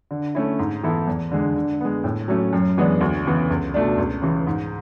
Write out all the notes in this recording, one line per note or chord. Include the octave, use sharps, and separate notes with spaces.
D3
A3 C#4 E4
G#2
E3 B3 E4 A4
E2
D3 G#3
D3
G#3 B3
A2
F#3 A3 C#4
F#2
E3 G#3 B3 D4
D2
C#3 E3 B3
C#2
B2 A3 D4
C#2
C#3 E3
G#2